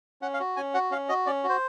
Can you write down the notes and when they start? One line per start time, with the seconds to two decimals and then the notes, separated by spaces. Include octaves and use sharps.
0.22 C#4 F#5
0.34 F5
0.40 F#4
0.56 C#4 G#5
0.74 F#4 F#5
0.91 C#4 F5
1.09 F#4 D#5
1.26 C#4 D5
1.44 F#4
1.49 C5